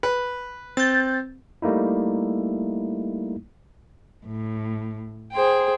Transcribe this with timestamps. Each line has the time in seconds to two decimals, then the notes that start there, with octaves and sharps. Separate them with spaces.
0.03 B4
0.77 C4 G6 A6
1.62 G3 A3 A#3 D#4 E4
4.27 A2
5.33 G#4 C5 G5